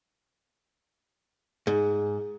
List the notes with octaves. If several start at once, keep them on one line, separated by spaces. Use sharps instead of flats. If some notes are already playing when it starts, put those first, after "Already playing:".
G#2 G#4